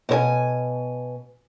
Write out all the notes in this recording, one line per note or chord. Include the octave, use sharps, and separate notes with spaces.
B2 C5 G#5